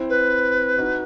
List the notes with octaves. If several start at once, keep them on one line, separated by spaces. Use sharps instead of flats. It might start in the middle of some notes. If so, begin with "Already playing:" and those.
Already playing: C4 E4
B4
D#4 F#4